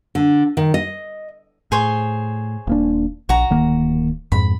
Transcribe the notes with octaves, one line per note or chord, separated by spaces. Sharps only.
D3
D#3
D#5
A2 G#4 C5 C#5
D#1 A#3 D4
A#1 F#4 A#5
D1 D#3 A#3
F2 G#2 B5